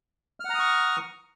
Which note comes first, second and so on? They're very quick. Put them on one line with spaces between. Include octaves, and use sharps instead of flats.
F6 F#5 A#5 D#6 C#6